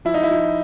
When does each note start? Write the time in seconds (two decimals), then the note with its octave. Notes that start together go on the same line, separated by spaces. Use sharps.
0.05 F3 E4
0.14 D#4
0.23 E4
0.30 F3